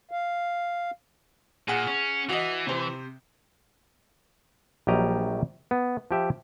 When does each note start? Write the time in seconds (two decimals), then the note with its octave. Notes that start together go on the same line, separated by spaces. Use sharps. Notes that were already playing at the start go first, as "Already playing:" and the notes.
0.11 F5
1.68 A#2 G#4 F#5
1.88 C#4
2.29 E3 F#4 D#5
2.67 C3 C5
4.87 A#1 F#3 G3 G4 D#5 A#5
5.71 B3
6.11 F3 G4 E5